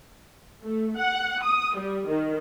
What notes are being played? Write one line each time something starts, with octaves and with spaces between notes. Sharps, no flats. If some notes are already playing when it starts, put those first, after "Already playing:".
A3
F#5
D#6
G3
D#3